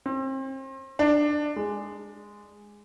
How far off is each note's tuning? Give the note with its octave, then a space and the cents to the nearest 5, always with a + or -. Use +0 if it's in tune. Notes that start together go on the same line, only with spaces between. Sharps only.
C4 +35
D4 +10
G#3 -5